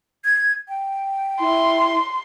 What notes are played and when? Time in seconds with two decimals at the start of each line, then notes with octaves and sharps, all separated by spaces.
0.25 G#6
0.68 G5
1.40 E4 C6